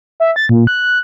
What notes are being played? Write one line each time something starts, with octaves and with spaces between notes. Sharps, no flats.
E5
A6
A#2
F#6